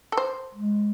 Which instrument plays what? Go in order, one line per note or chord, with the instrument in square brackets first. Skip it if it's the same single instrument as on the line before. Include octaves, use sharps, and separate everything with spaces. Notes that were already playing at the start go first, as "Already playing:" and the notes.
[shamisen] A4
C5
[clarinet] G#3